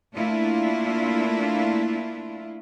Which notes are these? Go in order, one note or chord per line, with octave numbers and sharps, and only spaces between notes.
A3 A#3 D4 E4 F4